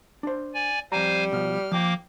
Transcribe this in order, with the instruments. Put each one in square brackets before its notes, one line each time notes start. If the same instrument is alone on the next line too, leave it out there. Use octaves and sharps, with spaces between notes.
[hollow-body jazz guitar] D4 C5
[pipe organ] D5 G#5
[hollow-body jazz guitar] F2 A#5 [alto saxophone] G3 [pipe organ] C5 F5 G#5
[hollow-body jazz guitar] B2 F3 [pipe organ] F6
[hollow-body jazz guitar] F3 G5 [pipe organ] A#3 D6